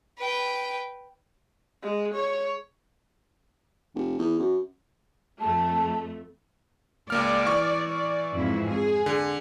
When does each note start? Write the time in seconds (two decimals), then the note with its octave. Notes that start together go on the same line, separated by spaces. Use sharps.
0.18 B4 G5
1.82 G#3
2.15 C#5
3.95 F1
4.19 E2
4.39 F#2
5.40 F2 A3 A5
7.10 C#2 A#3 D5 F6
7.46 E3 C#6
7.89 D5
8.36 F2 G#2 E4
8.68 G#4
9.06 D3